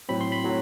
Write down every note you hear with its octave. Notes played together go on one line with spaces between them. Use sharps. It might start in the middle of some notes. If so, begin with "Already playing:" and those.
A2 F#3 C4 B5
C6
B5
A2 F#3